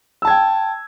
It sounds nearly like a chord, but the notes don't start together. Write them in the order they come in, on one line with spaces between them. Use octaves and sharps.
E6 A5 G#6 G5